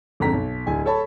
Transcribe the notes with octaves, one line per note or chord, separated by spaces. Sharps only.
G#1 F2 D3 A#5 B6
B1
D1 G#5
A4 C#5 A5 B5